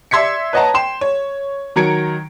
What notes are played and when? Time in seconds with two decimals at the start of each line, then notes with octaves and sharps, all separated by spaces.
0.11 D5 E5 C6 G#6 B6 C#7
0.53 B4 C#5 D#5 F#5 A5 A#5
0.74 G5 C6 E7
1.01 C#5
1.76 D#3 F#3 A#5 G#6 C#7 D7